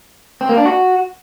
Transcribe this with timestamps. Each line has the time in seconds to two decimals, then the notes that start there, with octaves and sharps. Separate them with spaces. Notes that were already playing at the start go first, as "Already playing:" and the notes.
0.41 C4
0.49 A#3
0.57 D4
0.65 F#4